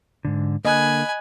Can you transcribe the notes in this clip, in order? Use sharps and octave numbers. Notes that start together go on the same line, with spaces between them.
G#2 D3
D3 A#3 D#5 G#5 B5 F#6